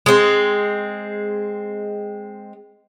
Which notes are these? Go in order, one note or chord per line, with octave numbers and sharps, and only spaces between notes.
G#3 C4